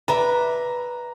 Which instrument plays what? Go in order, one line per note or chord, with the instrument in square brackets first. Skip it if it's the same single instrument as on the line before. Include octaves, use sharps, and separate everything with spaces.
[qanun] B4 D5 E5 [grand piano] A#5